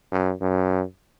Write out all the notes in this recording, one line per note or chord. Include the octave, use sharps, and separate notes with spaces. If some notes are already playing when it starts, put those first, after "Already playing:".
F#2
F#2